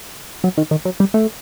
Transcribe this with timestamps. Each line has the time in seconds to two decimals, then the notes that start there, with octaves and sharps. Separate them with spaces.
0.44 F#3
0.58 D#3
0.71 D#3
0.85 F#3
1.00 G3
1.14 A3